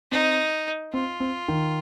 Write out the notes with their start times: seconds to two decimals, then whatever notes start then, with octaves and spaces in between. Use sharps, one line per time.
0.11 C4 D#4
0.93 C4 F4
1.20 C4
1.48 D#3